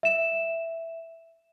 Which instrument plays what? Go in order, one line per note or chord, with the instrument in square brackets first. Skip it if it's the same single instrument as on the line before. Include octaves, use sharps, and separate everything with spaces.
[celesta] E5 E7